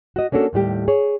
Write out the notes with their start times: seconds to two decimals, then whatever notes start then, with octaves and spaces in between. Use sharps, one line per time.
0.16 F#4 D#5
0.32 A#3 C#4 D4 F#4 A4
0.53 D#2 A2 G3 G4
0.88 G#4 C#5